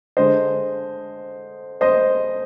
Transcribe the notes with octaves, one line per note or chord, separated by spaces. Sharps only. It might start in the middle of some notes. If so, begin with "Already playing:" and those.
D3 G#3 D4 C5 D#5
C5 D#5